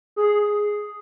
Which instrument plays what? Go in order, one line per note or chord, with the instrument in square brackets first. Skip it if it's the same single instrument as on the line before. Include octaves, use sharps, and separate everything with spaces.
[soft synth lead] G#4